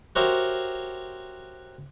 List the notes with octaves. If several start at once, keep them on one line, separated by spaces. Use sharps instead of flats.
F#4 G4 A#4 C5 C#5 E5